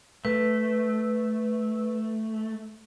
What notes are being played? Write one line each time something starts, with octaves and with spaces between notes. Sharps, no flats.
A3 B4